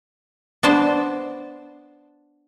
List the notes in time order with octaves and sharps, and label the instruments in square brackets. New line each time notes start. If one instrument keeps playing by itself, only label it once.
[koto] B3 D4 C5 D5 A5